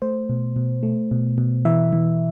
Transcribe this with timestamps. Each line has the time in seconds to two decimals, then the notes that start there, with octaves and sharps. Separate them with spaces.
0.02 A3 C5
0.29 B2
0.56 B2
0.83 A3
1.11 B2
1.38 B2
1.65 E3 E5
1.93 E3